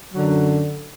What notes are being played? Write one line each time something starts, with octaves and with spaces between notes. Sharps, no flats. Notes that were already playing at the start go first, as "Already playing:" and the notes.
F#2 D3 F#3